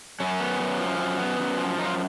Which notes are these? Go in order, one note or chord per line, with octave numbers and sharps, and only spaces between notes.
F#2 C#4
B3
F#2
F3
F#2
B3
F#2
F3
F#2 D#4
F4